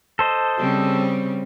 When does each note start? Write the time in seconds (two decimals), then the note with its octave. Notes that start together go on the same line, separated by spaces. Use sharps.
0.19 A4 C5 D#5
0.58 C#3 G3 C4